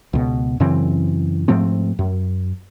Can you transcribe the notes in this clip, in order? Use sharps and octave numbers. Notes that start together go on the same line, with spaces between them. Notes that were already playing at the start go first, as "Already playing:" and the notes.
C#2 B2
F#2 C#3 E3 C4
G#2 F3 A3 C4
F#2